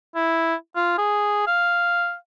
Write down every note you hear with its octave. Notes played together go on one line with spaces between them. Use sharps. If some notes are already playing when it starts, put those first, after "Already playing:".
E4
F4
G#4
F5